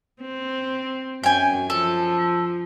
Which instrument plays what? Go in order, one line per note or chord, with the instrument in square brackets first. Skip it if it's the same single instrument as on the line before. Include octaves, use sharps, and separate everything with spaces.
[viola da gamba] C4
[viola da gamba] F#2 [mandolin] G5 G#5
[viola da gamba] F3 [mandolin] A4